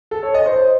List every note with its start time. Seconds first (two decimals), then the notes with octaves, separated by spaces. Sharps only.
0.11 A4
0.23 C#5
0.34 D#5
0.46 C5